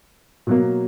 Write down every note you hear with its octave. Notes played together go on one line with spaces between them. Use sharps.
B2 F#3 A#3